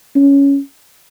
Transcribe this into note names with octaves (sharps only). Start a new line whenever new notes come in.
C#4